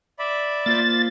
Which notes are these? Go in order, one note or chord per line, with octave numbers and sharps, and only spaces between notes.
D5 E5 B5
A#3 F4 C5 A6